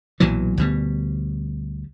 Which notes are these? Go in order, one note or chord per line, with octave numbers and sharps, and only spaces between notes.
B1 A#2 E3 F#3
D2 B2 G3